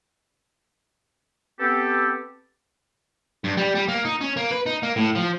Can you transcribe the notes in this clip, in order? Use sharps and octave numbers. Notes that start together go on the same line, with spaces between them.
B3 C4 G4 A4
G2
G3
G3
A#3
D#4
C#4
A#3
B4
D#4
A#3
A2
F3